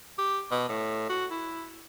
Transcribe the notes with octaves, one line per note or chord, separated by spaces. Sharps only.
G4
B2
A2
F#4
E4